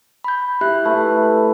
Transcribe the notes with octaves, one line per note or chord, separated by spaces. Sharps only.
B5 G6
E4 G4 E5 F#6
A3 B4